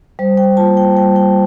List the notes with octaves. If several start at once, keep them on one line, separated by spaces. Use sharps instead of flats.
G3 C5
G5
A#3 F4 A5
G5
G3 G5
G5